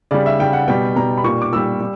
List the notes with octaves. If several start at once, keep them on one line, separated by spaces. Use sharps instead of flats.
C#3 G3 D5
E5
C#3 G3 G5
F#5
B2 G3 G5
B2 G3 A#5
B5
A#2 G3 C#6
D6
A#2 G3 E6
G3